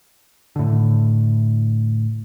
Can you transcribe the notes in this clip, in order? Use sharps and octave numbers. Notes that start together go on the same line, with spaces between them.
A2 D3